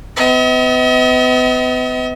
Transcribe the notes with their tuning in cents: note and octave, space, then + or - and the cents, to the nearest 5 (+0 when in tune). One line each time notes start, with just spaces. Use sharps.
B3 +35 D#5 +45